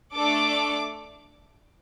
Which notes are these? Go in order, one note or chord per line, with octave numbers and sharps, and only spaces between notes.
A3 D4 A4 D6